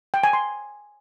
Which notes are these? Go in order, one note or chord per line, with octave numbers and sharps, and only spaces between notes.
G5
G#5
C6